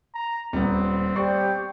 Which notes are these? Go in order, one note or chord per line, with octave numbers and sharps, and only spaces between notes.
A#5
D#1 G3 B3 C4
G4 C5 D5 C#6